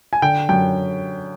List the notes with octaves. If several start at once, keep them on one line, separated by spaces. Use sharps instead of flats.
G#5
D3 G5
F#2 G5